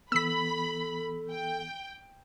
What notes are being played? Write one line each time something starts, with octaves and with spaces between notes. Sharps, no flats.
E3 B3 A4 B5 E6 B6
G5